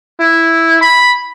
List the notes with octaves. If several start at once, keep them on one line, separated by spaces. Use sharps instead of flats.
E4
B5